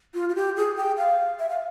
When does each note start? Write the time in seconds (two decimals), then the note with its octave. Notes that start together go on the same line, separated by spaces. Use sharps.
0.14 F4
0.29 F4
0.35 G4
0.57 G#4
0.77 G5
0.98 F5
1.39 E5
1.49 F5